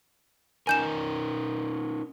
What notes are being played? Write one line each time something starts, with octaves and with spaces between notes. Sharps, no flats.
C#4 D#4 A#4 G#5 G6 E7